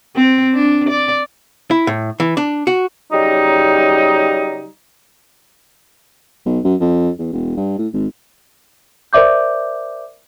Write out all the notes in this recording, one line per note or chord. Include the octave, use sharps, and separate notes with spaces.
C4
D4
D5
E4
A2
E3
D4
F#4
C#3 F#3 G3 D#4
B1
F#2
F2
E2
E1
G2
A2
G#1
A#4 C5 D5 E5 D6 G6